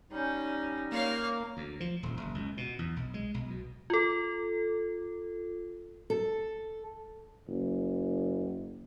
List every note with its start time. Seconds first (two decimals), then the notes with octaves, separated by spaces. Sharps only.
0.12 G3 C#4 D#4
0.92 A#3 C#5 F5
1.57 D2
1.80 F3
2.03 D#1
2.17 F#1
2.35 C#2
2.57 B2
2.79 E2
2.96 B1
3.14 G#3
3.34 B1
3.50 B2
3.90 F4 A4
6.10 A4
7.48 F#1